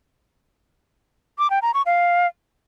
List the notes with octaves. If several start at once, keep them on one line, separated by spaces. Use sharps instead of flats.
D6
G5
A#5
C#6
F5